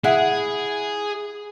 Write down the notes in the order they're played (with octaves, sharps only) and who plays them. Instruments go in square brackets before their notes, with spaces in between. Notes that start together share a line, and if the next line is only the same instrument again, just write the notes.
[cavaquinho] E4 F#5 [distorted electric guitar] G#4